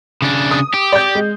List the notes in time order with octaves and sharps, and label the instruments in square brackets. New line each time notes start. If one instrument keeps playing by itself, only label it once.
[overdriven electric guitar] C#3 D4
[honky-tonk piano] D#6
[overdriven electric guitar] G4
[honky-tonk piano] D5 G6
G#3